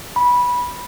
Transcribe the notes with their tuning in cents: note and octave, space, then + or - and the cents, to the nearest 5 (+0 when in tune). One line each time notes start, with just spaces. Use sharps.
B5 -15